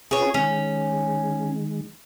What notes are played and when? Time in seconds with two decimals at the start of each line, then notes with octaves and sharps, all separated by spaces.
0.11 C#4 F4 G#4 B4 C#5
0.34 D#3 G#3 C#4